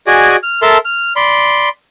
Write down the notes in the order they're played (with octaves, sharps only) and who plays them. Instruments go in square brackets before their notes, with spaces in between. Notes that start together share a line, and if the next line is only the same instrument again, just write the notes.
[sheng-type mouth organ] F#4 G#4 D5 D#5 G#5
F6
A4 A#4 E5 A5 C6
F6
D5 B5 C6